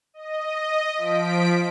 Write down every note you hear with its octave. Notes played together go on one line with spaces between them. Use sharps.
D#5
F3 B6 D7